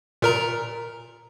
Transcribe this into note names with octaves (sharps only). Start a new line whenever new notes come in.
A#2 A#4 A#5